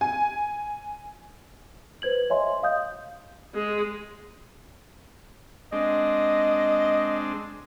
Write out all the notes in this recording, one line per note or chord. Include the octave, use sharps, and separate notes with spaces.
G#5
B4 C5 G#6 F#7
C#5 D#5 E5 G#5 C6
D#5 F5 D#6 G6
G#3
G#3 C4 D4 D#5